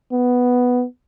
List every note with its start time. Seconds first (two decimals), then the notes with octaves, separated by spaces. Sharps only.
0.12 B3